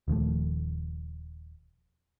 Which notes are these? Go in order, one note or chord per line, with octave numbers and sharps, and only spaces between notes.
D#1 D#3 F3 A3